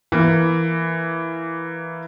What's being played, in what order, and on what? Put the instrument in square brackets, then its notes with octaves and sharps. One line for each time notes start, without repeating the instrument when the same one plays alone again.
[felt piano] E3 A#3